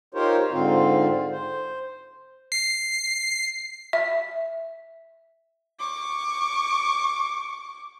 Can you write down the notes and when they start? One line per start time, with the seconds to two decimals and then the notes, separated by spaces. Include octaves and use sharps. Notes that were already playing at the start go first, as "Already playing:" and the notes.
0.14 D#4 F4 G4 A#4 C5 C#5
0.51 G#2 D3 C4 F4
1.31 C5
2.52 C7
3.93 E5
5.79 C#6 D6